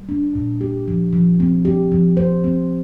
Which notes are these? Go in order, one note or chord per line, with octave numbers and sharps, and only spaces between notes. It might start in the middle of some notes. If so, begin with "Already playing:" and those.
Already playing: G3
D4
A#2
G4
F3
F3
C4
G4
F3
C5
C4